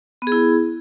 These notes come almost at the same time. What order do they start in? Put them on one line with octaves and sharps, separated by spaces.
B3 G#4 E4